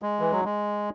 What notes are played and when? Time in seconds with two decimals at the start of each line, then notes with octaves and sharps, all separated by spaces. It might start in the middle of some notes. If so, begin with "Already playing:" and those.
0.02 G#3
0.20 E3
0.32 F#3
0.45 G#3